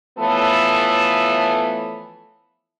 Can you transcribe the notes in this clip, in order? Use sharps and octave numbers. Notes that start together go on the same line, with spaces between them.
E3 F3 A3 B3 A4 C#5